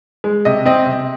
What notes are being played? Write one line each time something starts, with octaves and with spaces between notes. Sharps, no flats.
G#3
C3 D#5
C4 D#5
C3